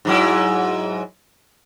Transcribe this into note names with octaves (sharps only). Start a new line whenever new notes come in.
G#2 F#3 E4